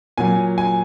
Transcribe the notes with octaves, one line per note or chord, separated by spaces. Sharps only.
A#2 F#3 G#5
G#5